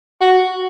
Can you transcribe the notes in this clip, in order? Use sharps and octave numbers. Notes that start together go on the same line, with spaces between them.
F#4